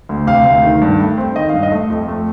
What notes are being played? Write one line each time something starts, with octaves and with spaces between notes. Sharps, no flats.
D2
C3 F5
D2
D#3
G2
A3
C4
D#3 D#5
G2 F5
D#5
A3
F2
A3